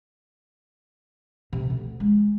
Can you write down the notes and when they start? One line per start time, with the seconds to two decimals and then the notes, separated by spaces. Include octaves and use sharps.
1.53 C3
1.70 D2
2.00 G#3